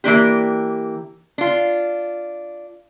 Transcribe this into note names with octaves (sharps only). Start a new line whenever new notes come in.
E3 A#3 D4 G4
D4 F4